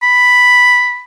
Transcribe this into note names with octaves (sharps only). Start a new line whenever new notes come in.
B5